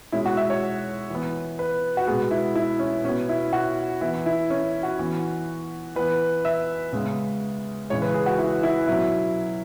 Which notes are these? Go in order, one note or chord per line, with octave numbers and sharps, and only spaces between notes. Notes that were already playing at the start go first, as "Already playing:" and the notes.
B2 G#3 C#4 E4
F#4
E5
C#5
E3
B3
B4
F#4
B2 G#3 B3 G#4
E4
E4
C#4
B2 B3 C#4
E4
F#4
E3 B3 E4
E4
C#4
F#4
E3 B3
E3 B3 B4
E5
C#3 G#3 B3
C#3 E3 G#3 C#5
B4
G#4
F#4
E4
E4
B2 F#3 C#4 E4